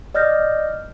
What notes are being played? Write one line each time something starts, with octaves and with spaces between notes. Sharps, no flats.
D5 D#5 F6 G6 A#6